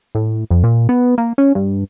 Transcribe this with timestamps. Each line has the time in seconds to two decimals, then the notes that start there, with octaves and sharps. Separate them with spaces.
0.15 A2
0.50 F2
0.64 A#2
0.89 B3
1.18 A#3
1.38 C#4
1.55 G2